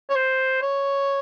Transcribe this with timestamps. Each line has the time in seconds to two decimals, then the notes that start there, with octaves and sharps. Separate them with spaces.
0.09 C#5
0.15 C5
0.62 C#5